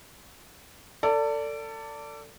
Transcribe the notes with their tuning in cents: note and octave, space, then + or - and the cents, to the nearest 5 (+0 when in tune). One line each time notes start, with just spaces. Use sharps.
A4 +30 D5 -15